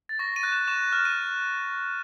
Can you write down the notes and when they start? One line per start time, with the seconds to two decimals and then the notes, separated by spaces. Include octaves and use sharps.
0.09 A6
0.19 C#6 A#6
0.36 D#7
0.43 F#6
0.52 E7
0.68 C#6 E7
0.93 F6
1.05 D#7